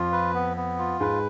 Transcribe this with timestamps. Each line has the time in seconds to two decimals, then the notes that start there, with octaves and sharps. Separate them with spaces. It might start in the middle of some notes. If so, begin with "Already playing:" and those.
Already playing: F2 F3 F4
0.12 B4
0.34 B3
0.57 B3
0.79 F4
1.00 G#2 G#3 B4